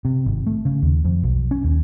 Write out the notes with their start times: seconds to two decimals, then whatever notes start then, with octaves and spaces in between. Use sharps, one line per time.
0.05 C3
0.26 G#1
0.46 A3
0.65 C#3
0.82 D#2
1.04 F2
1.23 B1
1.51 C#4
1.64 D#2